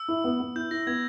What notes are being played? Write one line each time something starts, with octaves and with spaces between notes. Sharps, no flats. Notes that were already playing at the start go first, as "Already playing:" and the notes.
Already playing: E6
E4
B3
B3
E4 G6
E4 A#6
B3 G#6